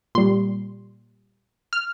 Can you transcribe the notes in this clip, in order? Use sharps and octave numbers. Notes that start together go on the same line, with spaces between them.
A#2 G3 C6
F6